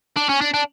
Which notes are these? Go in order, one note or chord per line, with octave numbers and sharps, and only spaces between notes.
D4
C#4
D4
D4